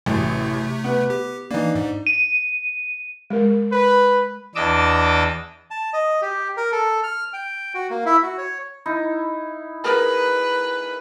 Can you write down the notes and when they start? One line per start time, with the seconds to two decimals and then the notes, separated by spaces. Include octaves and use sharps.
0.06 A1 F#2 C3 A3
0.84 B3 B4
1.10 G4
1.51 E3 A#3 D4 D#4
1.75 G#2
2.07 D#7
3.30 G#3 A#4
3.72 B4
4.55 E2 D4 D#5 D6 E6
5.71 A5
5.93 D#5
6.22 G4
6.57 A#4
6.72 A4
7.03 F6
7.33 G5
7.74 F#4
7.90 A#3
8.06 E4
8.23 F#4
8.38 C#5
8.86 D#4 E4
9.84 G#4 A#4 B4